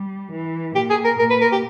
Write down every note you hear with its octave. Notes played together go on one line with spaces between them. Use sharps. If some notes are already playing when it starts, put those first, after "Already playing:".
Already playing: G3
E3
A#2 G4
G#4
A#4
A#2 A#4
B4
A#4
G4